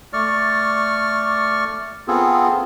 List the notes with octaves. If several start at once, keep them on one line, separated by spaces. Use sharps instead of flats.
A3 D5 C#6 F6
B3 C4 F4 G#4 A4